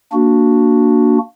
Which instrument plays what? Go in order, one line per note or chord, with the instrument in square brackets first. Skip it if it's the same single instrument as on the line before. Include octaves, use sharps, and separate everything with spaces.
[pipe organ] A#3 D4 F#4